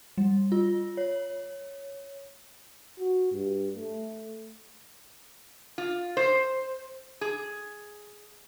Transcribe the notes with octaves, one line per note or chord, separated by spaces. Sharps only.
G3
F4
C#5
F#4
G2
A3
F4
C5
G#4